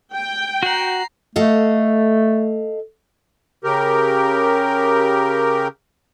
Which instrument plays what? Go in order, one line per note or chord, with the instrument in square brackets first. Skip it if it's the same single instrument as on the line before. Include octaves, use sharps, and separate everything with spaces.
[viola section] G5
[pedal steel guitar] F#4 F#5 [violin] A#5 C7
[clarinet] A3 [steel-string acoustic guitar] A4 D#5 F5
[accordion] C#3 G4 A#4